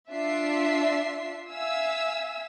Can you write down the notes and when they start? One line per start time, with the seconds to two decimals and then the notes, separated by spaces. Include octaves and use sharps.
0.13 D4 F4 E5 C7
1.49 E5 F5 G#5 E6